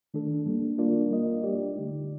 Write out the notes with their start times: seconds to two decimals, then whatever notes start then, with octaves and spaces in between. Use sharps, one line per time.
0.14 D#3 A3 D4 A4
0.46 G3 A#3 D4
0.78 A#3 D4 F4 A#4 D5
1.10 G3 A#3 F4 A#4 D#5
1.43 G3 D4 G4 D5
1.75 D3 A3 D#4